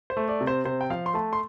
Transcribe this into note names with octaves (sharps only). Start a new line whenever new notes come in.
C5
A3
D5
C3
C5
C3 C5
G5
F3 F5
C6
A3 A5
C6